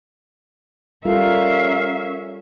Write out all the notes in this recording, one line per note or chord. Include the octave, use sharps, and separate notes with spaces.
G3 C#4 F4 A4 A#4 E5 F5